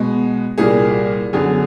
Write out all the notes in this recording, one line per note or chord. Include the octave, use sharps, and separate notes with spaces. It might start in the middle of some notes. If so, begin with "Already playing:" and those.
Already playing: B2 G#3 B3
C2 A#2 G3 A#3 G#4
F#2 D3 F#3 B3 G#4